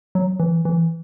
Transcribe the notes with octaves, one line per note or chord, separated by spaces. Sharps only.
F#3
E3
E3